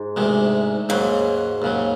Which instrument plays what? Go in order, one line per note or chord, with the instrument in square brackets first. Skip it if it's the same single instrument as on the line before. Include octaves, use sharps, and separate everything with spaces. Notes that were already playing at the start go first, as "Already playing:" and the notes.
Already playing: [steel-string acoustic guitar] G#2
[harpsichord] D2 C3 D#3 G#3
[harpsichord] D#2 C#3 F#3 [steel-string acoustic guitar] G#2
[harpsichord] D#2 C#3 F#3